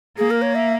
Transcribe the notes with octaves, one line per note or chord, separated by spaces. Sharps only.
A#3 G#4
A#4
C#5
E5